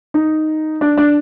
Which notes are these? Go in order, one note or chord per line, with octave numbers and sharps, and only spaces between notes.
D#4
D4
D4